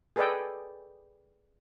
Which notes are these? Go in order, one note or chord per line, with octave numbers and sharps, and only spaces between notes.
G#4 A4 B4 D5 D#5 G5